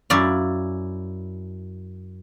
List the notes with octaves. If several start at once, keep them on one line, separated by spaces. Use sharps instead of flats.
F#2 E4 D5 F5